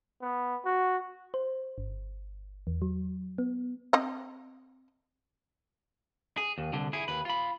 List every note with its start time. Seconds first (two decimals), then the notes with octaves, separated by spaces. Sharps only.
0.22 B3
0.65 F#4
1.34 C5
1.78 G1
2.67 E2
2.82 F#3
3.38 B3
3.93 C4 D#5
6.37 G#4
6.58 D#2
6.73 C2 D3
6.93 E4 G#4
7.08 D#2 B4
7.25 F4 B5